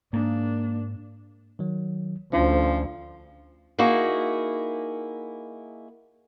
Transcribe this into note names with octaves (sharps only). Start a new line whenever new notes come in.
G#2 A#3 D4
D#3 F#3
D2 F3 C#4 D4 C5
A#3 D#4 E4 F#4 G#4